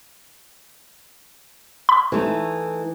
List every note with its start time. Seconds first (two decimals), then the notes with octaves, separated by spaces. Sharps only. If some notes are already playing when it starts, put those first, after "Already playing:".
1.89 B5
2.12 E3 A3 D#4